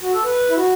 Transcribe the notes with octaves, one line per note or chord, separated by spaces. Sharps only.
F#4
A4
B4
E4
F#4